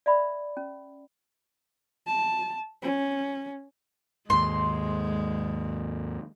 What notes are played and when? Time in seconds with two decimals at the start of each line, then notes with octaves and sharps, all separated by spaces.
0.06 D5 E5 B5
0.57 C#4
2.07 A5
2.82 C#4
4.30 D#2 G#2 G#3 C6